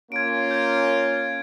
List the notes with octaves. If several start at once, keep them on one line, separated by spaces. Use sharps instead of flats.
A#3 C#4 F4 G#6 D7
G6 G#6